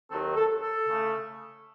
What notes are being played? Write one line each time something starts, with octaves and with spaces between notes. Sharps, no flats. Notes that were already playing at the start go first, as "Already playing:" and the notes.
D#2 D#3 F#3 C4 A4
A4
A4
C#3 A3